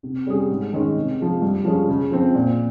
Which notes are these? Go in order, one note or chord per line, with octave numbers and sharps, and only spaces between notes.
C3
G3 C#4 G#4
G#2
D#3 G#3 C#4
C3
F3 G#3
G2
F3 G#3 C#4 G#4
C#3
F3 C4
A#2